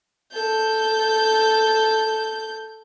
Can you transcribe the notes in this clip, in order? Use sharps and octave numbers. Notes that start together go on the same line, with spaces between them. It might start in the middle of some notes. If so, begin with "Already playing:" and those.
A4 G6